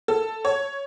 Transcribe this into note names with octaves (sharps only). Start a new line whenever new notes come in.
A4
C#5